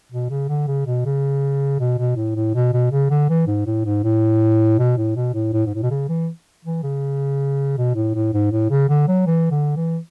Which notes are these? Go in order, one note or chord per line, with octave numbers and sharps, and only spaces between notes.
B2
C#3
D3
C#3
B2
C#3
B2
B2
A2
A2
B2
B2
C#3
D3
E3
G#2
A2
G#2
A2
B2
A2
B2
A2
A2
G#2
A2
B2
C#3
E3
E3
C#3
B2
A2
A2
G#2
A2
C#3
D3
F#3
E3
D3
E3